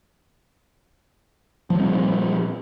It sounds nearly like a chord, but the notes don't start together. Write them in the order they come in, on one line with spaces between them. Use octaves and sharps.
F3 G3 C4 A#2